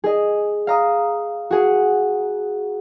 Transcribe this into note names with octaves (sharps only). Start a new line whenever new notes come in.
G#4 D#5
F5 A#5 D#6
F#4 G#4